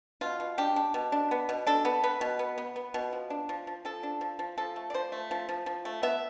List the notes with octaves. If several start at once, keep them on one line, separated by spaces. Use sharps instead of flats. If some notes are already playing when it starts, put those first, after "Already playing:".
B2 F4
B2
D4 G4
D4
B2
D4
B3
B2
D4 A4
B3
B3 B4
B2
B3
B3
B3
B2
F3
D4
F3
F3
F3 A4
D4
F3
F3
F3 A4
A3
D5
F3 C5
A3
F3
F3
F3
A3
B3 E5